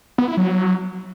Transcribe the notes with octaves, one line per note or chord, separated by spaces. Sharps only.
B3
E4
F#3